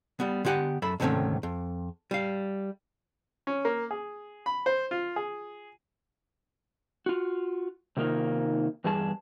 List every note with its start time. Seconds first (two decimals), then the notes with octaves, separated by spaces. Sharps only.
0.20 G3 B3
0.45 D3 B3 G4 F#5 G#5
0.82 F#2 A4 E5 B5
1.00 D2 G#2 C3 D#3 A3 C#4
1.43 F2
2.11 G3 F5
3.47 C#4
3.65 A#3
3.91 G#4
4.46 B5
4.66 C5
4.91 F4
5.16 G#4
7.06 F4 F#4
7.97 C3 D#3 A#3 D#4 F4
8.84 E2 G2 G#4 A5